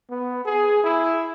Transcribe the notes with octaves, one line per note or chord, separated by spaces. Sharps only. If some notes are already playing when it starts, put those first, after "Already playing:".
B3
G#4
E4